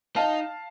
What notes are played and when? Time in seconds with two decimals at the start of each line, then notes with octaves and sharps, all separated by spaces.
0.16 D#4 F5 A5